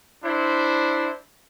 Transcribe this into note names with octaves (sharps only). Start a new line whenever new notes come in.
D4 E4 C5